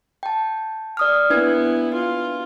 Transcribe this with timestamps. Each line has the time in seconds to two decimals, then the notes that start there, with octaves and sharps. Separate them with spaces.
0.23 G5 A5
0.97 D5 D#6 F6
1.30 B3 D4 E4 B4 G#6
1.94 F4